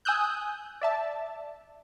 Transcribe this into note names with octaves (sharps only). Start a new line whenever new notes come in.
G#5 D#6 E6 F#6 G6
D5 E5 A5